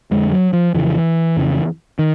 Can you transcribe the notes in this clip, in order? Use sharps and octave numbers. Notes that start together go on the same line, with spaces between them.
F2 D3 G#3
F#3
F3
F2 C#3 E3
F2 C#3
D#3